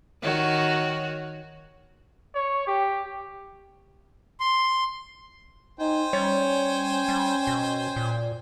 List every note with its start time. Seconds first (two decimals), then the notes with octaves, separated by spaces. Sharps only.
0.22 D#3 F#4 C#5
2.35 C#5
2.67 G4
4.40 C6
5.80 D#4 C5 G5 G#5
6.13 G3 C#4 C#5
7.08 G3
7.47 B2
7.96 A#2